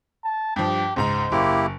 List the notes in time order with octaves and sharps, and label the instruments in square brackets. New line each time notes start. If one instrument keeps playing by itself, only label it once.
[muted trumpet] A5
[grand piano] G2 F3 [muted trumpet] G4
[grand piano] C#2 G#2 A#5 [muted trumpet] C5
[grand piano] F#1 [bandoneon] A#3 E4 G4